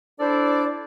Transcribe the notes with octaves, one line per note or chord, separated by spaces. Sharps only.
D4 E4 A4 C5 D5